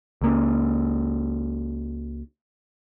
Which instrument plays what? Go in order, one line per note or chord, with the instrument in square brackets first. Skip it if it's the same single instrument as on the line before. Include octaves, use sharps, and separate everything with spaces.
[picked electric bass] C#2 A#3 C#4